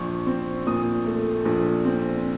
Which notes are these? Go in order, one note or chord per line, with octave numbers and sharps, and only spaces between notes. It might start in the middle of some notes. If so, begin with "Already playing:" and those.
Already playing: A#1 C#6
C4
A#2 D#6
A3
A#1
C4